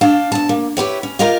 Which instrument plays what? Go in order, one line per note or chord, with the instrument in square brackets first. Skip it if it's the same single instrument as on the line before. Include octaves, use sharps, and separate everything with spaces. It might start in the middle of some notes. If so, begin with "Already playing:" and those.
[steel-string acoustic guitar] D4 F5 G5 A5
E2 A5
A#3
E4 G4 B4 C#5
C#4
F4 G4 A#4 D#5 F5